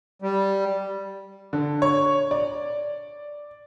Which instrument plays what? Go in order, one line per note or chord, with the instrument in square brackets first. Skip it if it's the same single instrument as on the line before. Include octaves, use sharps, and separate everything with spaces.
[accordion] G3
[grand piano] D3
C#5
D5